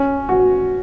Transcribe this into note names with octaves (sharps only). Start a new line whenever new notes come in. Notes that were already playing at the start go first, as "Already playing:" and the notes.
Already playing: C#4
F#4